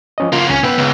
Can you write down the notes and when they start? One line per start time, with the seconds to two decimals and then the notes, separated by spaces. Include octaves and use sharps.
0.18 F3 C#4 D#5
0.32 C#3 A#3 F4 F5
0.50 C#2 C#4 G#5 G#6
0.63 B1 B3 B4 G5 E6
0.78 C#2